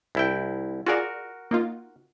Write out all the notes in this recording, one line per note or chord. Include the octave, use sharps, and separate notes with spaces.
C2 E4 G5
F4 F#4 G#4 A#4 D5
A#3 D#4 F4